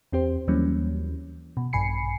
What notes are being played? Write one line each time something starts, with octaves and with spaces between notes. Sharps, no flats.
E2 C4 G4 C5
D#2 E3 F#3 G3 A#3 C#4
B2
A#1 G2 G#5 B5 C7 C#7